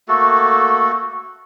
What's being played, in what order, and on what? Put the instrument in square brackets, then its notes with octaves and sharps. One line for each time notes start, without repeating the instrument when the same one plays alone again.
[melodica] A3 A#3 F#4 A4